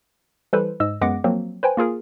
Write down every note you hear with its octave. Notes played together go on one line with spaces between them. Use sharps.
E3 G3 A4 B4 C5
G#2 D#5 E6
F#2 G#3 B3 F#5 D6 A#6
F3 F#3 A#3 C4
B4 C5 G5 G#5
A#3 F4 G#4 A#4